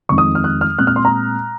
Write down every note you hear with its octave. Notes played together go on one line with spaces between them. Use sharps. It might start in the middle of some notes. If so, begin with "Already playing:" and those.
F2 D#3 G#3 C4 C#6
D#6
F6
F#6
F6
A#2 G#3 C4 F#6
F6
C6
A#5